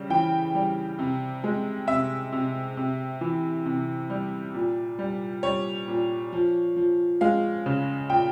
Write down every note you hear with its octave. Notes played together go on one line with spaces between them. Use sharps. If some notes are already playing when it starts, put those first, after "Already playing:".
Already playing: C#3 G3
E3 G5
G3
C3
G#3
C3 E5
C3
C3
E3
C3
G3
A#2
G3
G3 C#5
A#2
F3
F3
G#3 F5
C#3
A#2 G5